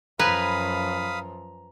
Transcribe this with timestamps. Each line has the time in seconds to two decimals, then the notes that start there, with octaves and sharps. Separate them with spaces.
0.19 F#2 F3 B4 F5 G#5 A#5 B5 D#6